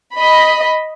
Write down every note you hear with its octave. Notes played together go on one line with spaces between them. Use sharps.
D#5 B5